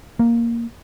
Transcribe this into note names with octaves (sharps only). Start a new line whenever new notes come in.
A#3